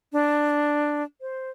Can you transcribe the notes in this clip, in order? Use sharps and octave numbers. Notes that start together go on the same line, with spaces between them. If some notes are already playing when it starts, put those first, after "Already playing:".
D4
C5